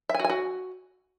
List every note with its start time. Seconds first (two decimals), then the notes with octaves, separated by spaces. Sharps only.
0.09 E5
0.14 G#5
0.19 F#4
0.24 G#5
0.30 F#4